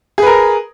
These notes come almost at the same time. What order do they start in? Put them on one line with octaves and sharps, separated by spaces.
G#4 B4 A#4